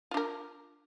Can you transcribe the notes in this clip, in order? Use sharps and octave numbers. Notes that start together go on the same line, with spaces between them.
D4 F4 A#4